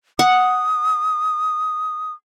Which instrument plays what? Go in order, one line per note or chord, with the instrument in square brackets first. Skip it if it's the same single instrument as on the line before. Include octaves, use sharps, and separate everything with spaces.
[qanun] F#5 [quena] D#6